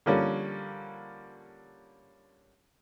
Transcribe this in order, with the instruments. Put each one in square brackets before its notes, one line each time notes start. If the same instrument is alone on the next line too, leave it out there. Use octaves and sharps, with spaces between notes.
[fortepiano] D3 F3 G3 A#3 C#4